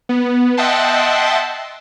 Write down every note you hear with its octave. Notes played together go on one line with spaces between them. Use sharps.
B3
D#5 E5 F#5 G5 A5 C6